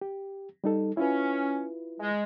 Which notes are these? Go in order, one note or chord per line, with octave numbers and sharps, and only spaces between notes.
G4
G3 D#4 A4
C#4 E4 F4 B4
G#3